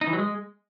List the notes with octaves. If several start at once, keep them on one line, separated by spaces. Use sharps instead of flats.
D#4
E3
F#3
G#3